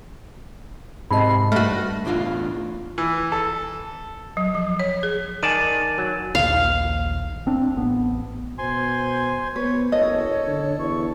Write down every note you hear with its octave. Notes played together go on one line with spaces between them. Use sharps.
G#2 C3 D#5 A5 B5 C7
G2 A3 F#4 F6 A#6
E2 A2 D4 F4 F5
E3
A4
F#3
F3
C#5
G#4
D#3 D5 G#5 A5 A6 D#7
F#3
A#1 D#2 F5
E1 C4 D4
A1 B3
B2 C5 G#5 C6
B3 B4 C#5
F#1 A4 C#5 D#5
D3
E2 C#6